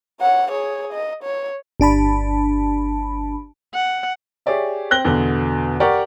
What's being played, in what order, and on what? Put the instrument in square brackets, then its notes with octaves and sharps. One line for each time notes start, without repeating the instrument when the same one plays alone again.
[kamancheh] C#5 F#5
G#4 C#5
D#5
C#5
[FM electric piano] G1 D4 A5 B5
[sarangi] F#5
[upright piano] G4 G#4 C#5 D5 E5
C4 G5 F#6 A#6 G7
E2 B2 D3
G4 A#4 D5 F#5 C#6